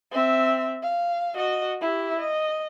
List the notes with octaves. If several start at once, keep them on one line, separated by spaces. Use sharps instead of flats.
C4 E5
F5
F#4 D#5
E4 G4
D#5